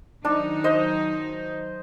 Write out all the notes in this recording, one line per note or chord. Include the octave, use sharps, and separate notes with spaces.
D#3 F#3 D4 D#4
C5 D#5